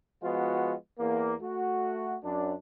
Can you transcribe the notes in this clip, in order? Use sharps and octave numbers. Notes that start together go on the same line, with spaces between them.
F3 G#3 B3 F4 F#4
E2 A#3
A3 F#4
F#2 D4